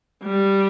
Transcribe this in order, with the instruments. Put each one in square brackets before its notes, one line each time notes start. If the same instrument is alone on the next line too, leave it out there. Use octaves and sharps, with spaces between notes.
[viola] G3